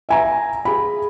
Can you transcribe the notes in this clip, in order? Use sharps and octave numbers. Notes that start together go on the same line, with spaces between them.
E5 G#5 A#5
G#4 B5